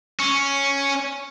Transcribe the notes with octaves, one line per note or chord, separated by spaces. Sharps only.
C#4